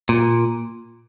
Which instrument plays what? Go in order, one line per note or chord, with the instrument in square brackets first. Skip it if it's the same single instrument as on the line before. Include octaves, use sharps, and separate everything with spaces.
[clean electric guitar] A#2